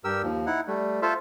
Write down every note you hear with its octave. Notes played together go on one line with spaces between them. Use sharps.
G2 G4 A#4 E6
D#2 F3
D#4 E4 F#5
G3 A3
F4 A4 C5 E5 F5